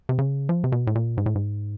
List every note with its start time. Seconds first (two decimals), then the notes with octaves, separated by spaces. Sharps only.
0.09 C3
0.19 C#3
0.49 F3
0.64 C3
0.72 B2
0.87 A2
0.95 A#2
1.17 G#2
1.26 A2
1.35 G#2